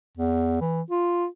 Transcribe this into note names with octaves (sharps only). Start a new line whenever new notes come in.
E2
E3
F4